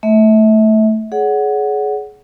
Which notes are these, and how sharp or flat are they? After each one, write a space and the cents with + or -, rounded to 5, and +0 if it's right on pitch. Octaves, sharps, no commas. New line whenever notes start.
A3 +0 E5 -35
G#4 +25 C#5 +45 F#5 +0